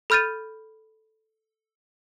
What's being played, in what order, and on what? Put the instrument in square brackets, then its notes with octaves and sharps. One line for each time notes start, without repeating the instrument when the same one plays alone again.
[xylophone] A4 B5 F6 G6 A6 D#7